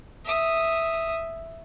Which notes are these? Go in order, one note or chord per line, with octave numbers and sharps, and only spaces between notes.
E5 D#6